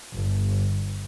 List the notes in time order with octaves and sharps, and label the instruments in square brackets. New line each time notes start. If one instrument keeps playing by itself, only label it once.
[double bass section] G1